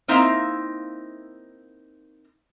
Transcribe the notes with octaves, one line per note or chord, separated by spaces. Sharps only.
A#3 C4 D#4 E4 E5 F5